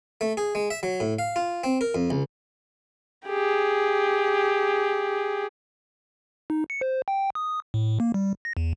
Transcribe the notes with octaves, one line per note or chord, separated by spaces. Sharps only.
A3
G#4
G#3
E5
F#3
A2
F5
F4
C4
A#4
F2
C#2
G4 G#4
D#4
C#7
C5
G5
D#6
A2
A#3
G3
A#6
E2